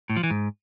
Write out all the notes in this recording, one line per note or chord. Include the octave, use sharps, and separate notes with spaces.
A2
F3
E3
G#2